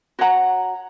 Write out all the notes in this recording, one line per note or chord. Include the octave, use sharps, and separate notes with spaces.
F#4 C#5 F#5 A#5